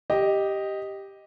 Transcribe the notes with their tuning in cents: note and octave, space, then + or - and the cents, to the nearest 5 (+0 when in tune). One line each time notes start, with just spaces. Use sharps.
G4 +0 D#5 +0